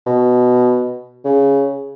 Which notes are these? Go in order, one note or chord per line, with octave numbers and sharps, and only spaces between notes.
B2
C#3